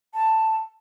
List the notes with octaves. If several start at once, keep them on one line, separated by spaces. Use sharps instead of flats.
A5